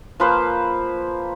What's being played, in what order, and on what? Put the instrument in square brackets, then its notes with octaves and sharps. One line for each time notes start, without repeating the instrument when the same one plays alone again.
[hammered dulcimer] F3 A#3 B4 C5